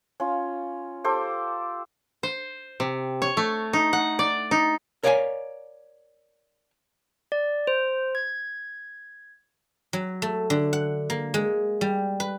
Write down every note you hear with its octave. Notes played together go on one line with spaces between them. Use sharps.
C#4 F4
G4 A4 C5 D6
C5
C3
C#5
A3
D#4
F#5
D5
D#4
A#4 C#5 D5 F5 F#5 G#5
D5
C5
G#6
F#3
A3
D3
F#5
A#3
G#3
G3
B4